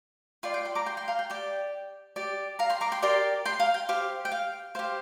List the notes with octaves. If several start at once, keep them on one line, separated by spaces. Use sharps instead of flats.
F4 D5 G5 C6
G5
G5 C6
A#5 D6
G5 C6
G5 C6
F5 A#5
G5
G4 D5 G5
G4 D5
F5 A#5
G5 C6
A#5 D6
G5 C6
G4 A#4 D5 G5 C6
G5 C6
F5 A#5
G5
G4 C5 F5
G5
F5
G4 C5 F5